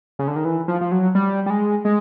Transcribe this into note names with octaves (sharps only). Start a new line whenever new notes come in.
C#3
D3
D#3
E3
F3
F3
F#3
G3
G3
G#3
G#3